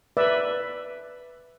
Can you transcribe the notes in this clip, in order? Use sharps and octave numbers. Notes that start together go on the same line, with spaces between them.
B4 D5 E5